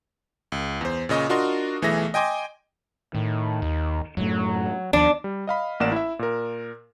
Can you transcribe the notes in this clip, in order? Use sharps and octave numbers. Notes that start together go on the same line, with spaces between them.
C#2
E2 C5
A#2 C#3 D#5 C#6 D#6
D4 F4 F#4 A#4 D#5 C6
B1 E3 A3 G#4 E5 A#6
D#5 G5 G#5 C6 D6
A2 D#3
D#2
F#2 A2 F#3 A3
D#2 F3 D4
G3
D#5 F5 B5
A1 A#3 A#4 D5 F#5 E7
E4 E5
A#2 A#4